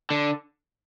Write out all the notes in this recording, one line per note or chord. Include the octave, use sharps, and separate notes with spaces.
D3